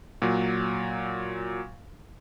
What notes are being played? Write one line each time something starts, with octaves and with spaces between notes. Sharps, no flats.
A#2 F#3